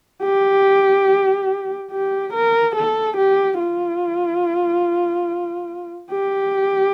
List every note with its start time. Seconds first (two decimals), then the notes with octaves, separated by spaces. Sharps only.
0.23 G4
1.91 G4
2.33 A#4
2.75 A4
3.17 G4
3.59 F4
6.12 G4